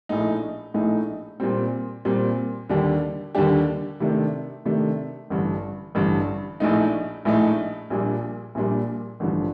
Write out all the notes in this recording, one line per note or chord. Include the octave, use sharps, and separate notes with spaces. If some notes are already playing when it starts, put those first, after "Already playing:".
A#1 A2 A3 D#4
A#1 A2 A3 D#4
A#2 G3 C4
A#2 G3 C4
D#2 D3 G3 D4 G4
D#2 D3 G3 D4 G4
C3 D#3 A3 D4
C3 D#3 A3 D4
A1 G2 D3
A1 G2 D3
A#1 A2 A3 D#4
A#1 A2 A3 D#4
A#1 A#2 G3 D4
A#1 A#2 G3 D4
A1 G2 D3 F3